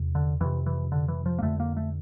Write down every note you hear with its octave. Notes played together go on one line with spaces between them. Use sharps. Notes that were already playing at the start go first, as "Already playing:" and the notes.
Already playing: E2 C3
D3
F2 C3 E3
E3
D3
E3
F3
A#3
F2 D3 A3
A#3
A3